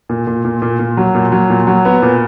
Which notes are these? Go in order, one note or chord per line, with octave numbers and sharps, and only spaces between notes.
A#2
A#2
A#2
A#2
A#2
F#3
A#2
F#3
A#2
F#3
B3
A#2